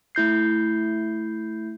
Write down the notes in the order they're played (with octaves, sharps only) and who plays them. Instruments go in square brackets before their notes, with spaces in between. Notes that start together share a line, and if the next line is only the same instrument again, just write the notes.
[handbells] A3 E4 G6 C7